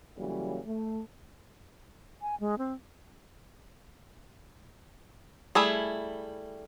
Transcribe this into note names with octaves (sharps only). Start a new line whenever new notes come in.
C#3 E3 F#3 G3 A#3
A3
G#5
G#3
C4
G3 A3 E4 G#4